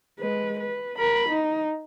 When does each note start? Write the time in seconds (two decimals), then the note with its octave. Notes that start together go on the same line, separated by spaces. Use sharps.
0.19 G#3 B4
0.59 B4
0.99 A#4 B5
1.29 D#4